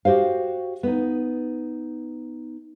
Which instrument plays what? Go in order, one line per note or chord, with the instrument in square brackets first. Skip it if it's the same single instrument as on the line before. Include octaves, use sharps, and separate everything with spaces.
[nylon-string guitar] F#4 G4 C5 F5
B3 D#4